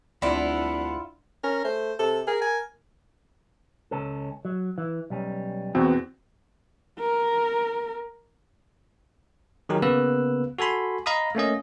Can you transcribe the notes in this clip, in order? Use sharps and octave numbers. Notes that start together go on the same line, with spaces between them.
D2 G3 C4 D4 E4 F4 D5 F#5
C#4 A#4
A3 C5
C3 A4
G#4 A#4
G#5
C#2 C#4 A4
F#3
E3
B1 G3 C#4
E2 B2 E3 C4 F#4
A#4
D#3 F#3 D#4 G4 G#4 A#4
C#3 A#3 B3 B4 E6 F#6
F#4 A4 G#5 B5 C6
D#5 F5 A#5 B5 D#6
A3 A#3 C#4 D#5